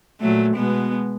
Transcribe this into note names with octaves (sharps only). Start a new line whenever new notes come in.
A#2 F#3 A3
B2 G#3 B3